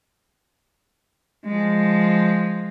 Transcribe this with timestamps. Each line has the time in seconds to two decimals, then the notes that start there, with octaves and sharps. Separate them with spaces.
1.46 F3 G#3